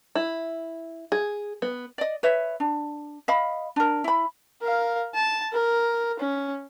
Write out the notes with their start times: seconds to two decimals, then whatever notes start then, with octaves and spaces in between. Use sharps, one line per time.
0.15 E4
1.12 G#4
1.62 B3
1.98 D5 D#5
2.23 B4 C#5 E5
2.60 D4
3.28 D#5 F5 B5
3.76 D4 A#4
4.04 E4 B5
4.62 A#4 F5
5.15 A5
5.52 A#4
6.20 C#4